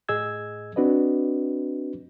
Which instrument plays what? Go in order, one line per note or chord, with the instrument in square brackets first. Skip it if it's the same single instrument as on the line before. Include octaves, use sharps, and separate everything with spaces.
[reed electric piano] A2 G#4 D#5 E6 G#6
C4 D4 F#4 B4 D#5